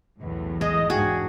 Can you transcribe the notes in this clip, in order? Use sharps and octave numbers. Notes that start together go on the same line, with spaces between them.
B1 E2 A2
G#3 D#5
E2 G#2 D4 F#4 G#4 F5 G5 G#5